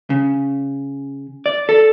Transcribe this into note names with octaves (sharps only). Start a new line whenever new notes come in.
C#3
D5
A4